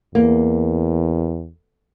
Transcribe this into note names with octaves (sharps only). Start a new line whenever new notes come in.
E2 A#3